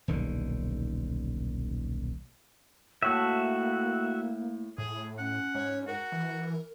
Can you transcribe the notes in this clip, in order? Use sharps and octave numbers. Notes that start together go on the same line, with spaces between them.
D#1 B1 D3 D#3
A2 A#3 F#4 E5
A2 G#4
C#4 F#5
G#2 C#5
F#4 A#4 F#5
E3